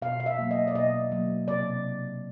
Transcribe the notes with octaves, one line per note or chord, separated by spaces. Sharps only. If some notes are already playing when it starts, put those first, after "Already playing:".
B2 F5
F5
E5
F#3 A#3
D#5
D5
B2 D#5
F#3 A#3
C3 D5